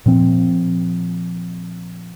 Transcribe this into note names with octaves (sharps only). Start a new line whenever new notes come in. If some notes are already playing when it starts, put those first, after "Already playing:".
A#2 F3 C4